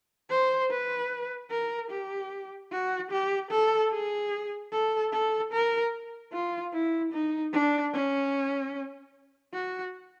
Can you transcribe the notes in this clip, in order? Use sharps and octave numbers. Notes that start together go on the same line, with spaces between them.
C5
B4
A#4
G4
F#4
G4
A4
G#4
A4
A4
A#4
F4
E4
D#4
D4
C#4
F#4